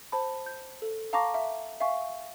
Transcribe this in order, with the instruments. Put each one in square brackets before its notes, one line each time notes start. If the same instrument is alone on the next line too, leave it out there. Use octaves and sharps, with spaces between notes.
[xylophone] C5 A5 B5
G6
A4
F5 A5 A#5 C#6 D6 A#6
E5
E5 F5 G#5 C#6